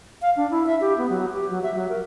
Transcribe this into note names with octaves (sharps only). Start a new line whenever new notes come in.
F5
D4
E4
E5
G4
B3
F#3
G4
F#3
E5
F#3
A#4